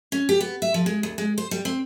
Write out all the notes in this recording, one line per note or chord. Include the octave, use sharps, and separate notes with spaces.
C#4
G4
B3
E5
F3
G#3
D2
G#3
C5
G3
C4